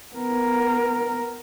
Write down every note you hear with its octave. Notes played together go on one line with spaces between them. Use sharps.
B3 A#4